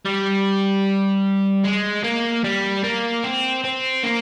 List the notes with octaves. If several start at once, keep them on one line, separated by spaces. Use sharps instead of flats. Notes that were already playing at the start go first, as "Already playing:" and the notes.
G3
G#3
A#3
G3
A#3
C4
C4
A#3